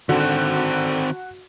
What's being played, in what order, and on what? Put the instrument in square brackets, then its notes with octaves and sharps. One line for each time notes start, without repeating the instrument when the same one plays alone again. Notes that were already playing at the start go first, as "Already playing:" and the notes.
[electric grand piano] D3 [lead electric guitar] D#3 C4 [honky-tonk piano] F#4